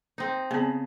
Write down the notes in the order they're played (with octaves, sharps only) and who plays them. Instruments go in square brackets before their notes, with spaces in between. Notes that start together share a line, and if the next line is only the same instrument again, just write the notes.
[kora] C4 D#4
[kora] C#3 [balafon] B3 C4